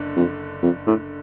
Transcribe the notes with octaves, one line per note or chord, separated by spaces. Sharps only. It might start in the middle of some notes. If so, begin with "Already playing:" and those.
Already playing: F#1 D3
F2
F2
A2